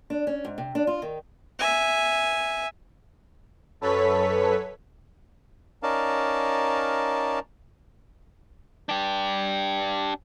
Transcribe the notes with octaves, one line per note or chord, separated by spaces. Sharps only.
D4
C#4
G#2
C3
D4
F4
D#3
E5 G#5
F#2 A4 B4 C#5 B6
C#4 D#4 A#4 D5 F5 A5
D4 G4